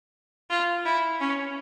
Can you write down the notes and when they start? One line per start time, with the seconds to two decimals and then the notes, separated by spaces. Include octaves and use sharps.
0.50 F4
0.85 E4
1.20 C#4